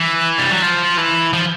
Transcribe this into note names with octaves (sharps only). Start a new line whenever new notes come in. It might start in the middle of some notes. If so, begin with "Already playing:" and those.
Already playing: E3
G3
F#3
F3
E3
F3